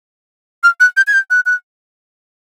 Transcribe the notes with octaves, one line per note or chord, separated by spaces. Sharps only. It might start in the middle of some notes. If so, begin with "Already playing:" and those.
F6
F#6
G6
G#6
G6
F#6
F#6